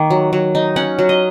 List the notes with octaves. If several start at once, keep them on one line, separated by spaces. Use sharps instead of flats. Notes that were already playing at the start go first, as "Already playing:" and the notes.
Already playing: D#3 A#3
F#3
F#3
D#4
C#4 F#5
F#3
D#5